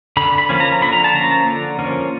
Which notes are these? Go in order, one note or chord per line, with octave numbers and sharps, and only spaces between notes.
D3 B5
B5
F3 A#3 C#4
A#5
D3 B5
A#5
A5
F3 A#3 C#4 A#5
D3
F3 A#3 C#4